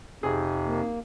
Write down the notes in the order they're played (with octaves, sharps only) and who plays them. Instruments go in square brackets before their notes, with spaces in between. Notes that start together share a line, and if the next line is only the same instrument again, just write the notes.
[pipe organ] F2 C3 [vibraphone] D#4 G4 [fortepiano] G#4
[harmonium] A#3